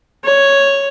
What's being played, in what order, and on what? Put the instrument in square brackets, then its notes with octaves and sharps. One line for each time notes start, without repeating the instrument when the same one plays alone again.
[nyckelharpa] C#5